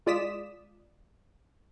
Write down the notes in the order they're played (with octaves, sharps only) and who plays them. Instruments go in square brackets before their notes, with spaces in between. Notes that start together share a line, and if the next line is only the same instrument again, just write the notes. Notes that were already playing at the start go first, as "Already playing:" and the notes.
[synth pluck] G#3 F4 D5 D#6 B6 E7